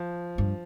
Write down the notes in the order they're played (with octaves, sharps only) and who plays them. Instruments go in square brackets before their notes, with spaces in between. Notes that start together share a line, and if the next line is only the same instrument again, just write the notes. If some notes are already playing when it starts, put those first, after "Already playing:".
Already playing: [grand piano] F3
[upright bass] G2